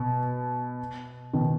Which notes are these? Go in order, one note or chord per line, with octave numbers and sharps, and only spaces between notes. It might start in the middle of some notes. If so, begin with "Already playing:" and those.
Already playing: B2
B2 D#3